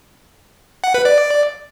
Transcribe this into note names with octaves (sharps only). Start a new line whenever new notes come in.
F#5
B4
D5